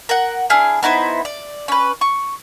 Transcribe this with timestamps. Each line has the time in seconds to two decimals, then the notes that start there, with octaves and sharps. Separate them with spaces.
0.09 A#4 F#5
0.50 D4 E4 G#4 F6
0.83 B3 D#4 E4 C5
1.25 D5
1.68 C#4 B4
2.01 C#6